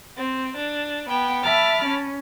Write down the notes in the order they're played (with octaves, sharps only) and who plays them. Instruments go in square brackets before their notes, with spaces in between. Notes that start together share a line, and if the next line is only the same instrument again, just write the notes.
[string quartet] C4
D4
B3 G5
E5 A5 B5 D6 F6
C#4